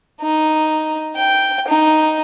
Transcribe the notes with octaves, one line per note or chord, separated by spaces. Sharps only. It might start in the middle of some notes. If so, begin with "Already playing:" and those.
D#4
G5
D#4